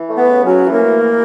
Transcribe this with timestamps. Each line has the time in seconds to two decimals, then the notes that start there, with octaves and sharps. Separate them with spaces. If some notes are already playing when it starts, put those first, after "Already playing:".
Already playing: E3
0.08 A3
0.17 B3 B4
0.27 C#3
0.45 F#3 C#4 F#4
0.64 E3
0.72 A#3 A#4
0.81 A3
1.00 E3